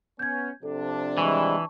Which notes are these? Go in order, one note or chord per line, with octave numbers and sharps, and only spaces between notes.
B3 C#4 G6 G#6
C3 F3 D4 A4
E3 G3 G#3 E4 A5 C#6